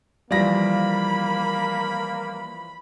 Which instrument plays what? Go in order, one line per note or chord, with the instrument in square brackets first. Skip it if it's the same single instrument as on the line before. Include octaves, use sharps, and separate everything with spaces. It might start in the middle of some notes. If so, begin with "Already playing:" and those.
[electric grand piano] E3 F3 D5 [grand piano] G3 F5 A#6 [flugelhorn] A#3 [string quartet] B5